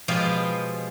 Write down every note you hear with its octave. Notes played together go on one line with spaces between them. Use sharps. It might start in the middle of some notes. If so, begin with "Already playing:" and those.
B2 F3 G#3 G4 F5